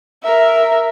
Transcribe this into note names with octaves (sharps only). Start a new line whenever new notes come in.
A#4 E5